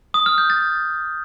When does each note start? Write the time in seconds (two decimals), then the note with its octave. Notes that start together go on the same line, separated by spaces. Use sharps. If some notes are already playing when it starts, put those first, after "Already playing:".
0.14 D#6
0.26 F6
0.38 G6
0.50 A6